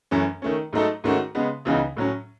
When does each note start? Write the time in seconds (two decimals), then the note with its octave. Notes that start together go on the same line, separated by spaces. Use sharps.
0.11 F#2 E3 A3 C#4
0.42 D#3 A3 C#4
0.73 G#2 F#3 A3 D#4 A4
1.04 G#2 D#3 A3 C#4 F#4
1.35 C#3 G#3 B3
1.65 C#2 C#3 E3 B3 D#4
1.97 A2 F#3 C#4